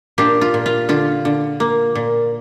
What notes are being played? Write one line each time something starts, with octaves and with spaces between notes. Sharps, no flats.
A#2 D4 G4
F4
A#2
F4
D3 F4
D3
A#3
A#2